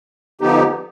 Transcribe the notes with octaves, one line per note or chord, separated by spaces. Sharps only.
D3 F3 B3 D#4 G4